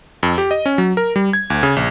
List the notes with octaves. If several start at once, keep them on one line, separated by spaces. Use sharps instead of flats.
F2
G4
D#5
C#4
F#3
A#4
G3
G#6
D2
C#3
A#1